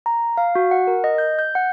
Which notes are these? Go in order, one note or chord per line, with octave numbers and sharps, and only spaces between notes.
A#5
F5
F#4
F#5
A#4
D#5
G6
G6
F#5